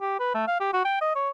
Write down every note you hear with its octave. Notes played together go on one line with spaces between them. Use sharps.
G4
B4
A3
F5
G4
F#4
G5
D#5
C#5